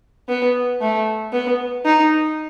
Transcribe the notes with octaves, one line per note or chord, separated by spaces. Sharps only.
B3
A3
B3
D#4